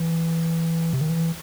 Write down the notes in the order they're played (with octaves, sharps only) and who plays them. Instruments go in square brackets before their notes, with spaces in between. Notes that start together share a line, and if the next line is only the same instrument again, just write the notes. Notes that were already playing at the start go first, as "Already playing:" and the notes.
Already playing: [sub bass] E3
C3
D#3
E3